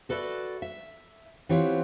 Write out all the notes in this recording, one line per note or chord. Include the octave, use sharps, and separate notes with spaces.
F#4 A4 B4 D5 E5
E5
E3 B3 C4 F4 G4 C#5